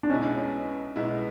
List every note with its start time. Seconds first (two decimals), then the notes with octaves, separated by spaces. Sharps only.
0.03 D4
0.10 B1 B2 G#3 B3 C#4 E4
0.96 B1 B2 G#3 B3 E4